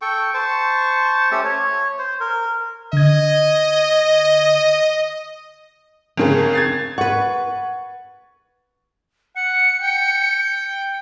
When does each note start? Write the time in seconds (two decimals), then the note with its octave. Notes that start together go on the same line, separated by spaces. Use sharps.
0.02 A4 G5 C#6
0.34 C5 A5 C#6
1.31 A3 C#4 G4 A4
1.44 C#5
1.99 C5
2.20 A#4
2.93 D3 D#5 G#6
6.17 G1 C#3 C4 G#4 A#4
6.53 G#6 A6 C7
6.98 B4 F#5 C#6
9.36 F#5 C#7
9.81 G5